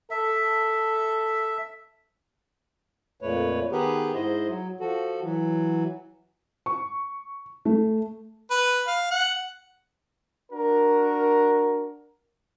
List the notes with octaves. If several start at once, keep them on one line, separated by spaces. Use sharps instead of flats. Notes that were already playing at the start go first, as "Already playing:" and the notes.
A4 E5
F2 A#2 A3 B4 C#5
D#3 B3 G4 G#4 A#4 B4
G#2 E4 C5 D#5
F#3
F3 F#4 A4
E3 F#3
C#6
A3
B4
F5
F#5
D4 F#4 A#4